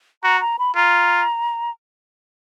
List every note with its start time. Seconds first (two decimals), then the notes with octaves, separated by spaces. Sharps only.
0.23 F#4 A#5
0.41 A#5
0.59 B5
0.76 F4 A#5